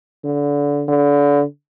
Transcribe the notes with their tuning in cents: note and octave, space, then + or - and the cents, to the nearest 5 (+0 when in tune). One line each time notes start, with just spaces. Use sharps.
D3 -25
D3 -30